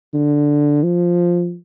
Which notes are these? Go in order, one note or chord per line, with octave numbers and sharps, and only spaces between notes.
D3
F3